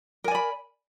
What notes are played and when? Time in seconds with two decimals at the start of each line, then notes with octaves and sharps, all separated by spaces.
0.24 A#4
0.28 G#5
0.31 D5
0.35 B5